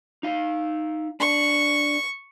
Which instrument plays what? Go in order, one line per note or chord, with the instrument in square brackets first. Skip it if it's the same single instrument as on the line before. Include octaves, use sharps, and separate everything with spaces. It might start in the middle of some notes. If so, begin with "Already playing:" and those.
[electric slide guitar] D#4 F5
[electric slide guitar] D4 [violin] C#6